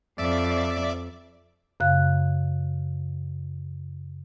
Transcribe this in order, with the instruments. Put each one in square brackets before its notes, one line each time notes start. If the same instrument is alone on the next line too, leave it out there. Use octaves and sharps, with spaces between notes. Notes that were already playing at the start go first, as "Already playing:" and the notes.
[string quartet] F2 [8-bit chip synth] D5 E5 D6
[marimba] F#2 C#3 F5 F#6